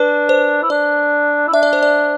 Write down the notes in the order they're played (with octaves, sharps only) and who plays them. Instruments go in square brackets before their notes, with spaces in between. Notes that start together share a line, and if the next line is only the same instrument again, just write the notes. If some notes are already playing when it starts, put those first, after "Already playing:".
Already playing: [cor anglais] D4 [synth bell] B4
[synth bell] C5
[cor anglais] E4
[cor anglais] D4 [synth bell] D5
[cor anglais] E4
[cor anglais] D4 [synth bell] E5
[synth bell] D5
C5
D5